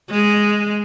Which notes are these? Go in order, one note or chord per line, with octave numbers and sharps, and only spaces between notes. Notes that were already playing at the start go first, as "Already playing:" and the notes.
G#3